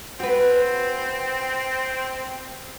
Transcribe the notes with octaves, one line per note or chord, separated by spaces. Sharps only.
C4 F#4 B4